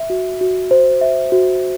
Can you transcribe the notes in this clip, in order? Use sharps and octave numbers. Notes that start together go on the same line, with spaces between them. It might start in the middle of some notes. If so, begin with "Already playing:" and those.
Already playing: E5
F#4
F#4
C5
E5
F#4